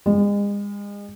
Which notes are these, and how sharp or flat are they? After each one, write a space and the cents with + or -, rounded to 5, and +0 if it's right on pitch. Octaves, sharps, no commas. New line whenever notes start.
G#3 -35